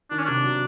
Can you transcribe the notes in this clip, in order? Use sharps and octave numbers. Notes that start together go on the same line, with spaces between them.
D#3 D4
C#4
C3 D4
F#3